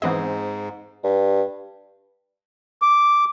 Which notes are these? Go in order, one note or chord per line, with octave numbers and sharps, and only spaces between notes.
G#2 E3 B3 C4 G#4 D#5
G2
D6